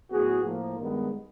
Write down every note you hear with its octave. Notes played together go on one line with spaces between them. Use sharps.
A2 F#3 B3 F#4 G#4
A2 F3 A#3
G2 D#3 G#3 B3